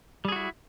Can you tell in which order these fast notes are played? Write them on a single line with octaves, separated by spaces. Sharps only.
G3 G#4 F#4 E4